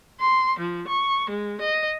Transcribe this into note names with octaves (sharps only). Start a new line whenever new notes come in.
C6
F3
C#6
G#3
D#5